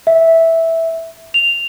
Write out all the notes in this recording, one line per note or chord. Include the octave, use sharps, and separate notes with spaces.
E5
F7